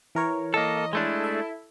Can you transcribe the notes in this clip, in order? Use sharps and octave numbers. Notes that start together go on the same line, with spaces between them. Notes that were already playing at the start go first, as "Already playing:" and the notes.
E3 A#4 C#5
A#3 A4 D#5
G#3 A3 D4 E4 A4
E5